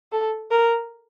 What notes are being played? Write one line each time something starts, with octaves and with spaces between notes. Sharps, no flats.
A4
A#4